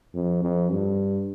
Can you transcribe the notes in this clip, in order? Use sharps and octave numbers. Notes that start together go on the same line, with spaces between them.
F2
F2
G2